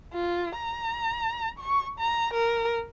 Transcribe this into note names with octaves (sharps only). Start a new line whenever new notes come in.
F4
A#5
C#6
A#5
A#4